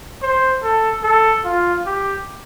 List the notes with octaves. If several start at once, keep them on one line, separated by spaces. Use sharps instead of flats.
C5
A4
A4
F4
G4